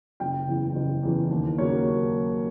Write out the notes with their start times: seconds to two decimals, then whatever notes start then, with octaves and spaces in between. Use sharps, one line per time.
0.20 F#1 G5
0.47 E2 C#3 E3
0.75 F#1
1.03 E2 C#3 E3
1.31 D#2
1.58 C#3 F#3 A#3 C#5